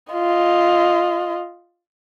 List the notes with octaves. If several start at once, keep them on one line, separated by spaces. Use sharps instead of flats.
F4 D#5